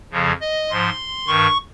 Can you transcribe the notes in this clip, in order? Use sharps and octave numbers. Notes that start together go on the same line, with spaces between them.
F2 C#3 F3
D#5
G#2 F3 C6
G2 D#3 C#6